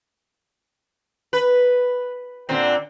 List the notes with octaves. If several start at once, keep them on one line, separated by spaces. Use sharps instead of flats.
B4
A#2 D3 C4